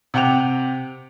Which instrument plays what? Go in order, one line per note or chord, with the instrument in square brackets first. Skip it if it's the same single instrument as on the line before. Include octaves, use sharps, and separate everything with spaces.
[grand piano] C3 F#5 G5 D6 F7